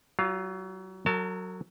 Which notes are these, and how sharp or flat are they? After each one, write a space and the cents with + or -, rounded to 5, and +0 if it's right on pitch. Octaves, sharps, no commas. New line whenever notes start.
F#3 +30 F4 +0 F5 +0
F#3 +0 A#4 -45 A5 -15